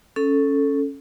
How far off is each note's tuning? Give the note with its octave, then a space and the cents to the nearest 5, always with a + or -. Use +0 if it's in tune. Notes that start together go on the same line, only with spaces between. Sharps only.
C#4 +0 A4 +0